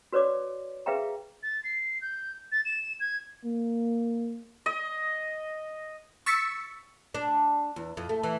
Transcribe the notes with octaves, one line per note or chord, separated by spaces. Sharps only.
F#4 B4 C#5 D5 D6
G#4 B4 E5 F5 G5 A#5
A6
C7
G6
A6
E7
G#6
A#3
D#5
C#6 E6 A6 B6 C#7
D4
E2
F2
A3
E3